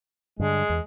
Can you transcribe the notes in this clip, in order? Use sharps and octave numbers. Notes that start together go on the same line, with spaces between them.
G2 D3 G#3
E2